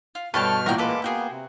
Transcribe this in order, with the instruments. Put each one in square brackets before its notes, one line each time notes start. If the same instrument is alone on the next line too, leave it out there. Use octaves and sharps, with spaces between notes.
[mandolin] F4
[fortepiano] G2 G5 [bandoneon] B2 F6 [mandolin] A4 C#5 A5
[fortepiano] A1 A#2 [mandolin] A#4 F#5 G5
[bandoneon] G#3 A#3 D6 [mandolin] A4 B4
[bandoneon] A#3 B3 [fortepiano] F#4 [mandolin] G#4 G5
[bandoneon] C3